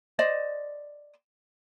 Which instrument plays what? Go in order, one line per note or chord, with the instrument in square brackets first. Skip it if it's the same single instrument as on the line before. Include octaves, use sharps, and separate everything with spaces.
[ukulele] C5 D5 D#5